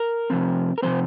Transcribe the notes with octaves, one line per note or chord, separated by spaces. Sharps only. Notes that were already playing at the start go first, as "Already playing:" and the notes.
Already playing: A#4
C3 F3 C4
A#4
C3 F3 C4 C5